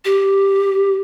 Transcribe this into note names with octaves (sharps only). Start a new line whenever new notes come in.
G4